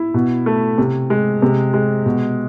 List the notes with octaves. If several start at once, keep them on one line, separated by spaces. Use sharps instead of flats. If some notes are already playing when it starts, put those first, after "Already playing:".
Already playing: E4
B2
A3
C3
G#3
C3
G#3
B2